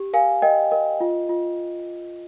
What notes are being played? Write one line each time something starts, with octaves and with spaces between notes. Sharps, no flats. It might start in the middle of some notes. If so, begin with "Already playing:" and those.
Already playing: G4
A#4 F5 G#5
A#4 D#5 G5
A#4 D#5
F4
F4